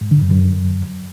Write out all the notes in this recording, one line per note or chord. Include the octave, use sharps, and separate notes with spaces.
G#2
D3
F#2
F#2